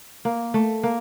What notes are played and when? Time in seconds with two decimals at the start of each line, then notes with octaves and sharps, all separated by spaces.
0.25 A#3
0.54 A3
0.83 A#3